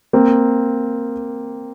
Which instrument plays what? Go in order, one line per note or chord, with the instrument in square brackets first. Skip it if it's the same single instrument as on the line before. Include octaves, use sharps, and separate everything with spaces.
[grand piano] A#3 C4